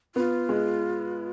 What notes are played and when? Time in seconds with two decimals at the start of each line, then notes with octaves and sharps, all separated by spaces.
0.15 B3 F4
0.49 G#3